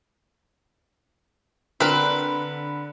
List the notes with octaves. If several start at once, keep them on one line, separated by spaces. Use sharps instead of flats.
D3 C4 A#4 B4